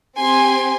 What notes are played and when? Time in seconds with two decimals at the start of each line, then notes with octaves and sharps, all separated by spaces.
0.18 C4 G4 G#5 C6